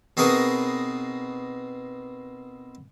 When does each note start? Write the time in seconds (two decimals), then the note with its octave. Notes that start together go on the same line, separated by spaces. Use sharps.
0.17 B2 C4 D#4 G#4 A#4 B4